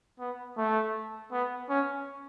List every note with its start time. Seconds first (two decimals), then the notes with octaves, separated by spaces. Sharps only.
0.19 B3
0.58 A3
1.32 B3
1.69 C#4